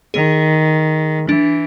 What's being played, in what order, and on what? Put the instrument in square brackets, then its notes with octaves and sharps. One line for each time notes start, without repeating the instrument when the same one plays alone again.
[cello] D#3 [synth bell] G#4
[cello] E3 [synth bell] D4